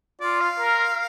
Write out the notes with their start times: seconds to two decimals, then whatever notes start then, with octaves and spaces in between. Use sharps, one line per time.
0.21 F4 D5
0.41 F5
0.59 A#4